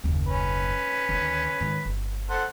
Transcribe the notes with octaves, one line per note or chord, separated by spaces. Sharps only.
F#1 D#2
C#4 B4
D2 D#3
G#2 D#3
G1
A4 C5 F#5